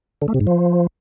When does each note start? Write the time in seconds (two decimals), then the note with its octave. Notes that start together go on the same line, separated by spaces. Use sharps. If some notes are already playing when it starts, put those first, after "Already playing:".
0.22 D3
0.28 A3
0.34 C3
0.41 G#2
0.47 F3